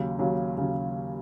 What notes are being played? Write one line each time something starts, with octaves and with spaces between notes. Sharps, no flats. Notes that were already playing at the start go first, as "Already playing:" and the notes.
Already playing: D#2 C#3 F#3
D#2 C#3 F#3
D#2 C#3 F#3